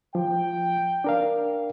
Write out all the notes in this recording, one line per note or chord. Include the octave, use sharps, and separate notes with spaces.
F3 G5
D4 A#4 F5